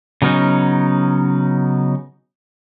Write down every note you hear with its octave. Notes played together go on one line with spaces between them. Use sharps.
C#3 F#3 B3 C#4 D#4